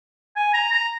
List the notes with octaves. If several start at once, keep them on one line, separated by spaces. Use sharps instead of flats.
G#5
A#5
A#5